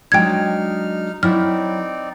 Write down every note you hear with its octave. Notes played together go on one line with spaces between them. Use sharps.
F#3 G#3 D4 D#4 G5 F6 G#6
F#3 C4 D#4 E4 D5 G5 F6